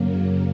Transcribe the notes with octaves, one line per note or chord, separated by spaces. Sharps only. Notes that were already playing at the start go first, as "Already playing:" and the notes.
Already playing: F#2 C#3 F#3 A#3